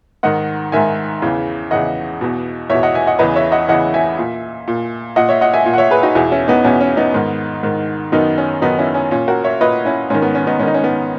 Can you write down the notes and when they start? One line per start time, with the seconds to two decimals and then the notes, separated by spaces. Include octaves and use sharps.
0.23 G#2 D#3 D#5 F#5
0.72 G#2 D#3 E5 G#5
1.22 E2 C#3 E3
1.71 E2 C#3 E3 D#5 F#5
2.21 E2 B2
2.70 E2 B2 C#5 E5
2.83 D#5 F#5
2.94 E5 G#5
3.07 D#5 F#5
3.19 E2 C#3 E3 B4 D#5
3.36 C#5 E5
3.52 D#5 F#5
3.68 E2 C#3 E3 D#5 F#5
3.94 E5 G#5
4.18 A#2
4.68 A#2
5.16 A#2 D#5 F#5
5.29 C#5 E5
5.41 D#5 F#5
5.54 E5 G#5
5.66 A#2
5.74 F#5
5.78 C#5 E5
5.91 G#4 B4
6.03 D#4 F#4
6.15 E2 B2 E4 G#4
6.32 C#4 E4
6.48 B3 D#4
6.64 E2 B2 C#4
6.81 C#4
6.97 B3 D#4
7.14 G#2 D#3
7.63 G#2 D#3
8.12 F#2 D#3 B3 D#4
8.38 C#4
8.62 F#2 D#3 B3 D#4
8.78 C#4 E4
8.94 C#4
9.11 A#2 C#4
9.28 F#4 A#4
9.44 C#5 E5
9.61 A#2 B4 D#5
9.85 C#4 E4
10.10 G#2 D#3 C#4
10.22 B3
10.35 C#4
10.47 B3 D#4
10.59 G#2 D#3 C#4
10.67 D#4
10.74 C#4
10.84 B3